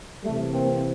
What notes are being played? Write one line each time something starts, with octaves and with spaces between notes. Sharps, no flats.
C3 E3 G3 A3
A#3 C4